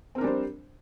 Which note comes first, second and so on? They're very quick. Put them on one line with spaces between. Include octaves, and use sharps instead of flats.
C4 A#4 D4 G3 C5